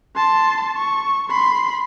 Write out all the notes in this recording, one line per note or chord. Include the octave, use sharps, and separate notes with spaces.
A5 C6
C#6
B5 C6